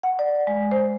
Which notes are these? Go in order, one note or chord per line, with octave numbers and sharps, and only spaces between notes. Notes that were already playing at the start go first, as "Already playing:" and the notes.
F#5
D5
G#3
C5